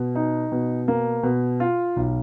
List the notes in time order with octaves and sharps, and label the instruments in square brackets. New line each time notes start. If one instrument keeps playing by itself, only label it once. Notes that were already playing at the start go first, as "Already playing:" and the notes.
Already playing: [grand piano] B2
D#4
B2
A#3
B2
F4
B1